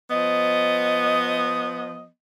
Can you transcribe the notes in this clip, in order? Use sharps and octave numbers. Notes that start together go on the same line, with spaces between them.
F3 B3 D#5